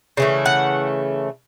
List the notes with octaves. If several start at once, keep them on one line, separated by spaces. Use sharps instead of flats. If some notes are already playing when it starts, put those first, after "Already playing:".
C#3 E3 A3
F#5